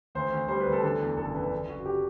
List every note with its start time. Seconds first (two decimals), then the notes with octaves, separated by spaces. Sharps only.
0.15 D2 C5
0.32 D2
0.48 G3 C5
0.60 B4
0.67 D2
0.72 A4
0.83 D3 A4
1.00 E2
1.17 F#1 A4
1.35 D3 B4
1.52 D3
1.68 F#1 F#4
1.86 G4